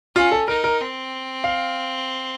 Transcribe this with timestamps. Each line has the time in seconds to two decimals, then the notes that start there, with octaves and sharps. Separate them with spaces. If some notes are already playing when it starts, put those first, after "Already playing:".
0.16 C#4 F4
0.32 A4
0.48 D#4 A#4
0.64 A#4
0.80 C4
1.44 F5